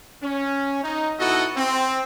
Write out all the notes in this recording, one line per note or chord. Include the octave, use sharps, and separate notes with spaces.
C#4
D#4
B2 D#4 E4 F#4 A4 D#5
C4